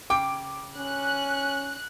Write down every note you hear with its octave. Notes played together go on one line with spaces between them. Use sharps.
C#3 G5 D6
C#4 F#6